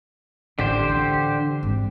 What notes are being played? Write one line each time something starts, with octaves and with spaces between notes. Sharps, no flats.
A1 D3 G4 C5
E3
G#1